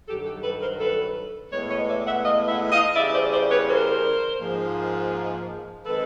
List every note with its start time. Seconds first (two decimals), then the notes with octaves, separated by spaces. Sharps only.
0.08 G2 D#3 F#3 G4 A4
0.26 G4 A4
0.43 A4 B4
0.61 A#4 C5
0.80 A4 B4
1.52 A2 E3 G#3 B3 B4 C#5
1.70 C#5 D#5
1.88 D5 E5
2.06 E5 F#5
2.24 D#5 F5
2.48 E5 F#5
2.72 D#5 F5
2.96 C#3 E3 G3 D5 E5
3.14 C5 D5
3.32 C5 D5
3.50 B4 C#5
3.68 A#4 C5
4.40 G#2 F3 A#3
5.85 D#3 G#3 C4 A4 B4